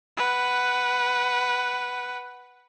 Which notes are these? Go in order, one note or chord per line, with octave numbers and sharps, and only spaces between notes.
B4 F#5